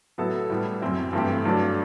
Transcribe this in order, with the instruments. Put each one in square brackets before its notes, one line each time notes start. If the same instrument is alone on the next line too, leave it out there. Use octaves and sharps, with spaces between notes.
[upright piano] A2 F#3 B3 E4 A4
A2 G3 B3
F#2 F#3 C4 E4
G2 E3 A3 C4 G4
G2 F#3 A3 D4